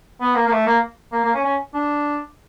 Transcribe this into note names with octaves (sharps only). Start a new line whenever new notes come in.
B3
A#3
A#3
A3
A#3
A#3
A#3
C#4
C#4
D4